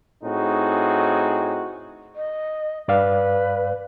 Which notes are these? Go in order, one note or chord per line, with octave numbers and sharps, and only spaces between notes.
A2 C4 D#4 F#4 G#4
D#5
G2 B4 D5 F5